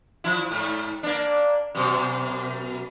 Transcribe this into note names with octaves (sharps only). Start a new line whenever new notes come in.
F3 E4
G#2
A#3 D4
F#2 B2